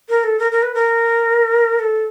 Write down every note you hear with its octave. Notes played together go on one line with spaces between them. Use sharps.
A#4
A4
A#4
A#4
B4
A#4
A4